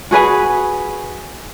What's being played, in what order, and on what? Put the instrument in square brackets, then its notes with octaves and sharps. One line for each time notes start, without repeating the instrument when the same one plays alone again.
[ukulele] F#4 G#4 B4 G#5